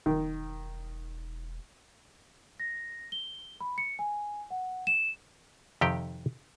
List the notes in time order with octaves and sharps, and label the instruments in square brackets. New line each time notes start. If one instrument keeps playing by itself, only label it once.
[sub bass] E1 [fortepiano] D#3
[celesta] A#6
G7
B5
C#7
G#5
F#5
E7
[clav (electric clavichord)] F2 C3 D#3 G4 G5